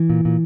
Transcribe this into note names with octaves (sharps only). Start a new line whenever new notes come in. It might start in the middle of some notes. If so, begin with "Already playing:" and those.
Already playing: E3
A#2
A#2